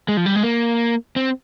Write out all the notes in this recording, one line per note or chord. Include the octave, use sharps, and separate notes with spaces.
G#3
F3
G3
G#3
A#3
C4